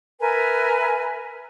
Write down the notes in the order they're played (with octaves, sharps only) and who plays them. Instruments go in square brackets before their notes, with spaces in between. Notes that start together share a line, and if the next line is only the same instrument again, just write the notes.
[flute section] A#4 B4 E5 G#5